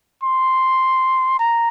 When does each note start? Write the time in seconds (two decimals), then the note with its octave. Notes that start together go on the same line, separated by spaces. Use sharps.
0.24 C6
1.39 A#5